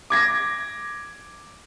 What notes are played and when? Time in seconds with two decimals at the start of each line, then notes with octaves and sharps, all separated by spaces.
0.10 D6 G#6 A#6